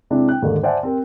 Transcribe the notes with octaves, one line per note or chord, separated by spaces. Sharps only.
C3 G#3 C4 D4 E4
G5 F#6
D#2 G#2 D3 A3 A#3
C5 D5 E5 F#5 G#5 A5
C4 G4 A#4